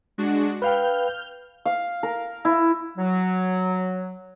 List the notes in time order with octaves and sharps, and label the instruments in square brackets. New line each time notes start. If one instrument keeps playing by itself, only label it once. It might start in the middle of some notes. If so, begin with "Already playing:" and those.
[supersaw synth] G#3 D4 F#4
[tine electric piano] B4 F5 G5 [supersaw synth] F6 G6
[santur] F5
A#4
E4
[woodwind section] F#3